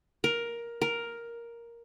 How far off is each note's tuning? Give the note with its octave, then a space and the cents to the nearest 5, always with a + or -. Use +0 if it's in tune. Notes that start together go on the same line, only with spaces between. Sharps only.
A#4 +10
A#4 +5